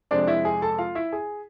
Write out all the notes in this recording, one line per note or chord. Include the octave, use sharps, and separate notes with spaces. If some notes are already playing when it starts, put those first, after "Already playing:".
F2 C3 G#3 C4 D4 D5
E4 E5
G#4 G#5
A4 A5
F4 F5
E4 E5
G#4 G#5